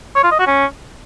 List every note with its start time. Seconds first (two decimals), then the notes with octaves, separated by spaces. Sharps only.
0.16 C#5
0.23 F4
0.31 D#5
0.39 F#4
0.47 C#4